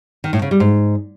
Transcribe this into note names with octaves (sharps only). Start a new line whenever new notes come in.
D#3
A2
C#3
G3
G#2